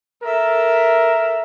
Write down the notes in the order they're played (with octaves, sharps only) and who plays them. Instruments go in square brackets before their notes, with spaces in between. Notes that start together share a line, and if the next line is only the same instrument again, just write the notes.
[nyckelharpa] A4 E5 [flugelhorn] A#4